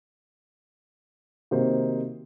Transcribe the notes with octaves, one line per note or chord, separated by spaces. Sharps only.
C3 D#3 A#3 D#4 F#4 C5